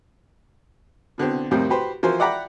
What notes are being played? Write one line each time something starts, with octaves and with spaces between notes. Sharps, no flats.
B2 D3 B3 C4
F2 A2 D#3 G3 C4
F#4 G4 B4 C5
E3 F3 F#4 A#4 C5
D5 E5 F#5 G5 A#5 B5